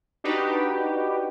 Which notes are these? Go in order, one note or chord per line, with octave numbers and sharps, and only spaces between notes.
D4 D#4 F#4 G4 B4